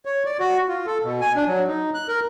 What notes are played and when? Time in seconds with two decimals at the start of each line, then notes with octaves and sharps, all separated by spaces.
0.05 C#5
0.25 D5
0.40 F#4
0.68 F4
0.86 A4
1.04 B2
1.21 G#5
1.36 D4
1.48 F#3
1.67 D#4
1.94 F#6
2.08 A#4